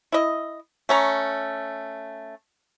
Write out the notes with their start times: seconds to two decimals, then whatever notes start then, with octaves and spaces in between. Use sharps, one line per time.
0.12 E4 D#5
0.89 A3 C#4 A#5